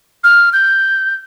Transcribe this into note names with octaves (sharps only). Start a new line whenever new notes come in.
F6
G6